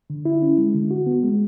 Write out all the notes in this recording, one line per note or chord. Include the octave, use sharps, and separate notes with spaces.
D3
E4
C#4
G#3
D3
F#4
B3
G#3